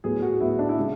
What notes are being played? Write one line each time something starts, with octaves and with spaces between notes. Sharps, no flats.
A2 F#3 B3 G#4
F#4
A2 F#3 B3 E4
D4
E4
C#3 G#3